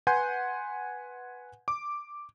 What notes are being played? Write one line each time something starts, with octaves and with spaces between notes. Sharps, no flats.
B4 F#5 G#5 C6 G6
D6